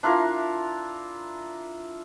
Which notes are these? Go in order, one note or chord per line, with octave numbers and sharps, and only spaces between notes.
D4 E4 F4 A#4